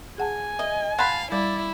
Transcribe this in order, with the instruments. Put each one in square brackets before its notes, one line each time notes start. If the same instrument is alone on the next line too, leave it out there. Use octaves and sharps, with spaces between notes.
[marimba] G#4 F#5 A5 [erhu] G#5
[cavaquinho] D#5 [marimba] E5
[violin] F5 [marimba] F#5 C6 F#6 [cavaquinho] A5 B5
[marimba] G3 [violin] E4 [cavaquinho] D5